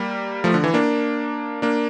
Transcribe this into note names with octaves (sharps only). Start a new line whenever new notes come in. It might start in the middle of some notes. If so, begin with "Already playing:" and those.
Already playing: G3 A#3
F3 A3
D3
E3
A#3 D4
A#3 D4